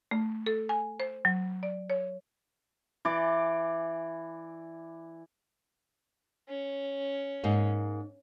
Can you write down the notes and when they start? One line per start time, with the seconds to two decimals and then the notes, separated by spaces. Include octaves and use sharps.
0.11 A3
0.46 A4
0.69 G#5
1.00 C5
1.25 F#3
1.63 D5
1.90 C#5
3.05 E3 D5 D6
6.49 C#4
7.44 G#2 A#3